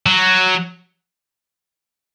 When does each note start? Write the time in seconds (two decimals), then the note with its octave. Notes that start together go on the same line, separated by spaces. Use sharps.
0.06 F#3